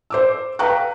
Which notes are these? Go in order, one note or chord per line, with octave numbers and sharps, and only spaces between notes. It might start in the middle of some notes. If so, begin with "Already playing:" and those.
C5 D6 E6
B4 F5 G5 A#5 C#6 F#6